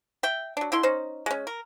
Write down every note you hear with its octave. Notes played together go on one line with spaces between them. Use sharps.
E5 G5
F#3 D4
D3 E4 C6
C#4 D#4 C5
G#3 C#4
A#4